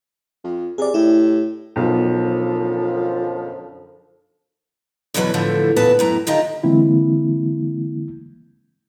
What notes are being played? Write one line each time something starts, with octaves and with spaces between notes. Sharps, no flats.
F2
C3 G#4 D5
A2 E4 G4
B1 F#2 D3 F3
E2 B2 D3 F#3 B4 C#5
A2 D3 F3 A3
E2 A#2 B3 B4 A5
F#2 A2 A#5
D3 D#3 F4 G4 D#5 A#5
D3 E3 G#3 A#3 C4 E4